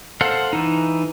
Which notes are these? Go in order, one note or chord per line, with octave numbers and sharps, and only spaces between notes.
A4 C5 F5 F#5
E3 D#4